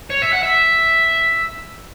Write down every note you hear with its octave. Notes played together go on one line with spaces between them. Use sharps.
C#5
E5
F#5
E5